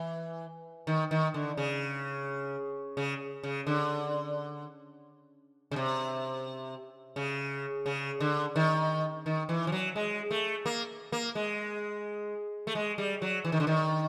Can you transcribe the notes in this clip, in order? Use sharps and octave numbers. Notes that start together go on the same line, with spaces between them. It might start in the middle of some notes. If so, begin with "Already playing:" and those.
Already playing: E3
D#3
D#3
D3
C#3
C#3
C#3
D3
C#3
C3
C#3
C#3
D3
D#3
D#3
E3
F3
F#3
G#3
A3
A#3
A#3
G#3
A3
G#3
G3
F#3
E3
D#3
D3
D#3